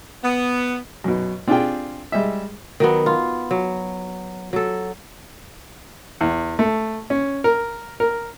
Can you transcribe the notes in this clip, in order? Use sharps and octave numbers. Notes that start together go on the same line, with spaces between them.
B3
F#2 B2
C4 D4 F4 G4 G#4 G5
G3 G#3 E5
D#3 F#3 B3
F4
F#3
F#3 A4
E2
A3
C#4
A#4
A#4